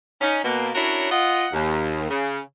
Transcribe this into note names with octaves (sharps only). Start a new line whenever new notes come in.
C#4 D#4
B2 A#3
C#4 D4 E4 F#4 A#4 C#5
F4 D#5 F#5
D#2
C#3